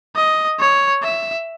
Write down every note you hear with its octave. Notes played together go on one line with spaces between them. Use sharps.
D#5
C#5
E5